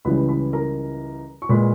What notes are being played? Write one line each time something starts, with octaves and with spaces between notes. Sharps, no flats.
C#2 C#3 E3 G3 B4 B5
B4 B5
A#4 A#5
C#6
A#2 G#3 B4 B5